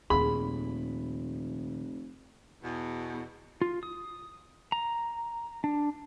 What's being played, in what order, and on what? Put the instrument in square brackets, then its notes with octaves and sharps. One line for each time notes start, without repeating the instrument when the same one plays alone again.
[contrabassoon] F1 [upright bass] D#2 A#2 [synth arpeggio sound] G#4 [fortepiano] B5
[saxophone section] E2 B2
[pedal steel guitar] F4
D#6
A#5
D4